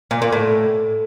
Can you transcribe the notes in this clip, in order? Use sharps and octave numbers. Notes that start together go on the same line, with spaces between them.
A#2
A#2
A2